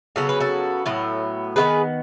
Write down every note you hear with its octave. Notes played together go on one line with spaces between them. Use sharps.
C#3 F#3 B3 A4
B4
F#4 A4
A2 F#3 B3
D#3 G#3 B3 G#4 B4